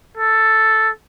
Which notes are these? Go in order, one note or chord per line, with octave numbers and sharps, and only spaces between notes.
A4